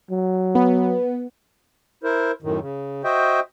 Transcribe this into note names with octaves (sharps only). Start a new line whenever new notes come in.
F#3
B3
E4 A#4 C5
F#2 A2 D#3
C#3
F#4 C5 D#5 E5 G5